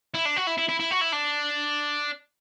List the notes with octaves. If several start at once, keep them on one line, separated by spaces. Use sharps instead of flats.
E4
D4
F#4
E4
E4
E4
E4
F#4
E4
D4